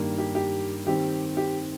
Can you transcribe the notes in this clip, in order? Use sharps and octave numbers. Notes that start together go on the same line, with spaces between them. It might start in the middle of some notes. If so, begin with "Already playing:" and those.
Already playing: G2 D#3 G3 A#3
G4
G4
D#3 G3 C4 G4
G4